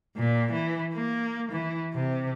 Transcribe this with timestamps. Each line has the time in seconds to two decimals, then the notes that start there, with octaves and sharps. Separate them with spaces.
0.17 A#2
0.52 E3
0.94 A#3
1.52 E3
1.94 C3